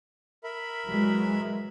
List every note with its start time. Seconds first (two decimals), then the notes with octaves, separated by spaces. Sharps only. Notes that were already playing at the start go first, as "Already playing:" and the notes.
0.44 A#4 E5 B5
0.87 E3 F#3 G#3